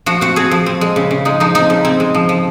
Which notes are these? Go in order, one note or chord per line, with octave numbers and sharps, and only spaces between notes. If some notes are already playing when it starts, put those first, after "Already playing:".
F3 F#4
C4 F#4
C4 G#4
F3
C4
G#3
C#3
C#3
G#3 D#4
F3 D#4
C4 D#4
C#3
C4
G#3
F3
F3